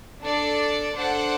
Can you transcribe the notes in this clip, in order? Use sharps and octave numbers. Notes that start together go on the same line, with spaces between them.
D4 A4 D5
D4 A4 C5 F#5